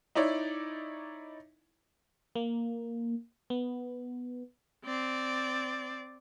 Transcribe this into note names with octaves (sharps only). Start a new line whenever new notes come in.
D#4 E4 C#5 D5
A#3
B3
C4 D5